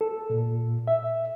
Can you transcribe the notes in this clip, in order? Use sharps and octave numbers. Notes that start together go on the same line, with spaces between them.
A4
A#2
E5